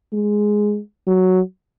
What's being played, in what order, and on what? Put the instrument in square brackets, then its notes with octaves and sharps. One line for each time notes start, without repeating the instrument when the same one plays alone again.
[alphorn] G#3
F#3